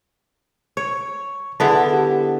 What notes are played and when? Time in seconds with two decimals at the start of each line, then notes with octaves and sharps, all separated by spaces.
0.77 C#5 C#6
1.60 D3 B3 E4 G#4 A5
1.93 G4